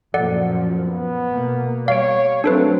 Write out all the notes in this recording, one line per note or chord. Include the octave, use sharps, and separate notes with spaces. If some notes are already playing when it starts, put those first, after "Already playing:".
F#2 A#2 F3 A4 D5 F#5
B3
B2 A#3
G3 C#5 F5 D7
F#3 A3 C4 D4 A4 B4